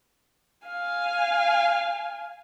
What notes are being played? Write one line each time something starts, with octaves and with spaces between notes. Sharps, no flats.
F5 G#5